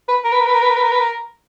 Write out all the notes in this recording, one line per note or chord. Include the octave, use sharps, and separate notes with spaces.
B4
A#4
B4
A#4
B4
A#4
B4
A#4
B4
A#4
B4
A#4